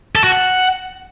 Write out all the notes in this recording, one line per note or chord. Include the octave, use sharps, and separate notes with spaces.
A4
F#4
F#5